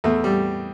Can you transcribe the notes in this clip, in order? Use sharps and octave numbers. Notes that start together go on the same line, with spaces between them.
E2 A3
G3